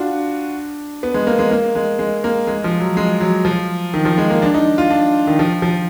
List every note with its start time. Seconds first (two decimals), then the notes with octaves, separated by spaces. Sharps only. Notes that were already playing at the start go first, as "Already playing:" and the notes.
Already playing: D4 F4 F#4
1.03 B3
1.14 G#3
1.27 A#3
1.39 G#3
1.51 A#3
1.75 G#3
1.99 G#3
2.24 A#3
2.47 G#3
2.64 F3
2.80 F#3
2.97 G#3
3.20 F#3
3.45 F3
3.94 D#3
4.05 F3
4.18 G#3
4.30 A#3
4.42 D4
4.54 D#4
4.78 F4
4.90 D4
5.27 D#3
5.39 F3
5.62 F3